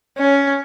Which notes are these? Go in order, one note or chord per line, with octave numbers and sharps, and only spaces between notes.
C#4